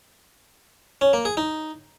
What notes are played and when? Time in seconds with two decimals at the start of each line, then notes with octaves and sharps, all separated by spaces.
1.01 C#4
1.13 A#3
1.25 G#4
1.37 D#4